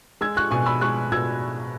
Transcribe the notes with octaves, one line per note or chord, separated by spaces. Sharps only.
G#3 E6 G#6
C#6 F#6
B2 G#5 C#6
B5 E6
G#3 C#6 F#6
B2 E6 G#6